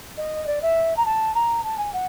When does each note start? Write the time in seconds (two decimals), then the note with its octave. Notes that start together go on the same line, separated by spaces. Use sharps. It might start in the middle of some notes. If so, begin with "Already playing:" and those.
0.17 D#5
0.47 D5
0.62 E5
0.96 A#5
1.05 A5
1.35 A#5
1.63 A5
1.78 G#5
1.93 F#5